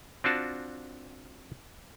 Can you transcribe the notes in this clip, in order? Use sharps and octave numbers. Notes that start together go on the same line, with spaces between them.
C4 D4 F4 F#4 A5